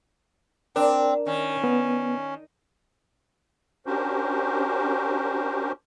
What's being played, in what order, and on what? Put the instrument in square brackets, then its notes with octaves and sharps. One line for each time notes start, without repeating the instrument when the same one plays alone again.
[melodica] C4 [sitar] D4 [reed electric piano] A#4
[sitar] D#3 [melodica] C#4
[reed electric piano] B3
[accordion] C#4 D4 F#4 G4 A#4 C5